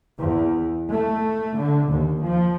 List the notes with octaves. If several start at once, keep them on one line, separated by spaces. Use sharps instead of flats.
E2
A3
D3
D#2
F3